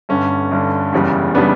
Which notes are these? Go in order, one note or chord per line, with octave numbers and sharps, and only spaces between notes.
G1 G2 D3 C#4
G1 G2 D3
F#1 E2 C#3 G3
C#3 G3 B3 D4